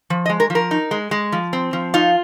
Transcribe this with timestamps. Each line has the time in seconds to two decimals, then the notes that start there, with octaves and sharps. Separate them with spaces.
0.10 F3
0.26 D#5
0.29 G#3
0.40 A#4
0.50 F3
0.55 A#4
0.71 D#4
0.91 G#3
1.11 G#3
1.32 F3
1.53 C4
1.73 F3
1.94 D#4 F4